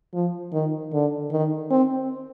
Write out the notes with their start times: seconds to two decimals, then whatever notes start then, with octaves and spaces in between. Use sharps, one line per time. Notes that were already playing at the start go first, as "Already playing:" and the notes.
0.14 F3
0.53 D#3
0.93 D3
1.32 D#3
1.71 C4